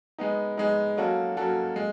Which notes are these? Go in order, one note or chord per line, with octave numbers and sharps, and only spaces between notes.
G#3 B3 D#4
G#3 B3 D#4
F#3 A#3 C#4 F#4 A4
F#3 A#3 C#4 F#4 A4
G#3